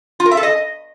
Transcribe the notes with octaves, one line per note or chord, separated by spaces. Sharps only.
F4
A#4
E5
A4
D#5